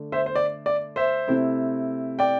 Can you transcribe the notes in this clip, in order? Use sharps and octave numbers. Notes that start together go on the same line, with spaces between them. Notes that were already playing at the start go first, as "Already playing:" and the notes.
Already playing: D3 A3 D4
C5 E5
C5
D5
D5
C5 E5
C3 A3 C4 E4
D5 G5